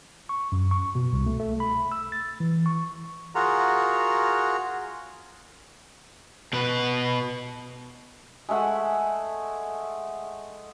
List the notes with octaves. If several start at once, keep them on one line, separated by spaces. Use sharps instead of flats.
C#6
F#2
C#6
B2
C2
A3
A3
B5
E6
A6
E3
C#6
F4 F#4 G#4 A#4 F#5 A#5
B2 B4
G#3 A3 E5 F#5